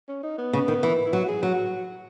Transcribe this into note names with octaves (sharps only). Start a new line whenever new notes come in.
C#4
D#4
B3
C#3
D#3
E3
E4
F#3 F#4
G#4
F#3 F#4